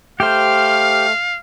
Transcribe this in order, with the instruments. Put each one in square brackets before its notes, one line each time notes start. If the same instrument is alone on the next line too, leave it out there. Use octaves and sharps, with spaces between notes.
[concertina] A3 F6 [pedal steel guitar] G4 C5 [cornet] F5